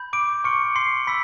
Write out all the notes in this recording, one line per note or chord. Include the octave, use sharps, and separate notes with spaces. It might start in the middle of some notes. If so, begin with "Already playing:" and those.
Already playing: B5 G6
D6 D7
C6 C#6 F6 C#7
C6 C7
B5 C6 E6 B6